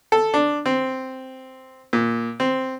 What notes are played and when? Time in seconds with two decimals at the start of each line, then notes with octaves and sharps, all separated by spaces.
0.12 A4
0.34 D4
0.66 C4
1.93 A#2
2.40 C4